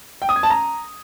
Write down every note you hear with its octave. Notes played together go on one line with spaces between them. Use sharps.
G5
D#6
G#6
A5
A#5